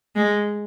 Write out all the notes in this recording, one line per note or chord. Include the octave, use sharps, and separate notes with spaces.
G#3